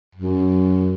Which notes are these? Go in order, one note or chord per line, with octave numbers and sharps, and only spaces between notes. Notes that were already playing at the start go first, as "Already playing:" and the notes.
F#2